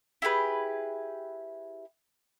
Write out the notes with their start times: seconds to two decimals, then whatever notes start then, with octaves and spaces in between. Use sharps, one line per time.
0.22 E4 G4 G#4 B4